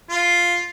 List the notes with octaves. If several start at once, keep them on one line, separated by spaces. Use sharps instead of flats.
F4